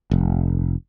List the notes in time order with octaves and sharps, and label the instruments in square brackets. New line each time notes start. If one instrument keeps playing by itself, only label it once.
[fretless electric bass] F1